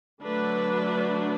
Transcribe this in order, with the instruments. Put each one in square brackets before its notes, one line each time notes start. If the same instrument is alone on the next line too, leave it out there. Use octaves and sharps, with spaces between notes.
[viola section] D3 F#3 A3 D4 B4